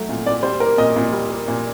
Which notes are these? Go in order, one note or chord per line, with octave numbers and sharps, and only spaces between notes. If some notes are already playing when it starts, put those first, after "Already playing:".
Already playing: F#3 A3
A#2
A#2 D5
G3 C5
A#3 A#4
A#2 D#5
A#2
G3
A#3
A#2